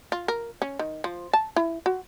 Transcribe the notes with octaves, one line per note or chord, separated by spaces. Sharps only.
F4
A#4
C#4
D#3
F3
A5
E4
F#4